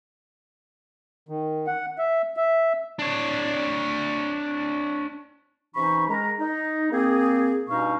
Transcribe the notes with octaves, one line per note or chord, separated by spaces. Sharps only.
D#3
F#5
E5
E5
D4 C#5
C3 E3 C#4 D#4 B5 C#6
G#3 A#4 A#5
D#4
A#3 C4 G#4
G2 B2 C#4 D#4 F5 C#6